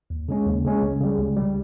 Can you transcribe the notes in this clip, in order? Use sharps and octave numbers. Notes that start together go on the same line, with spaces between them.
D#2
C#3 G#3 C#4
D#2
C#3 G#3 C#4
C#2
C#3 G3
C#2
G3
C#3